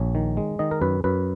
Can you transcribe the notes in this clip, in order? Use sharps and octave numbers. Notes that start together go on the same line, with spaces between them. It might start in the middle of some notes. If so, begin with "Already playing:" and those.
Already playing: A#1 C#5
D#3
G#3
D#3 D#5
A#4
F#2 B4
F#2 B4